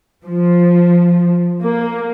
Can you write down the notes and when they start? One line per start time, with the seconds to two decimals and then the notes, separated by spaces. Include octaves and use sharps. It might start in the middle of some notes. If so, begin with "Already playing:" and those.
0.24 F3
1.62 A#3